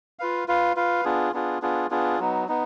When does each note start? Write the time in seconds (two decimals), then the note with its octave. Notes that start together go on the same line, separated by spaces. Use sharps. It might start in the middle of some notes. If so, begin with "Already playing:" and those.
0.19 F4 B4 F5
0.48 F4 B4 F5
0.76 F4 B4 F5
1.05 B3 D4 F4 G#4
1.33 B3 D4 F4 G#4
1.62 B3 D4 F4 G#4
1.91 B3 D4 F4 G#4
2.19 F#3 B3 D#4
2.48 B3 D#4